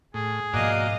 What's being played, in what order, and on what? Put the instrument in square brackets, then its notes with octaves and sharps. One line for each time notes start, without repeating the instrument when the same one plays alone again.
[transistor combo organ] A2 [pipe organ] G#4
[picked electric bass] G#2 B2 F3 [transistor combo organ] A#3 F#4 D5 [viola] D#5 F5